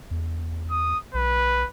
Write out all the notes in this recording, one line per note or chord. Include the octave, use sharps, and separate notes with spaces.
E2
D#6
B1 B4